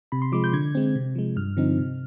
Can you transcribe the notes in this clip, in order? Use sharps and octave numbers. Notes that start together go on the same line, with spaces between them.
C3 B5
C6
F3 G#3 D6
G6
D3 G#6
G#3 C4
C3
F3 G#3
G2 F6
D3 F3 C4 D#4
C3